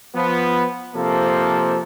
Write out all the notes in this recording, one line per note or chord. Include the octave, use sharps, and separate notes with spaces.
F3 B3
C3 F3 A#3 A4